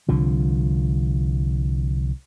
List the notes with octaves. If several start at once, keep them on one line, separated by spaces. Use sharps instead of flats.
C2 D3 F3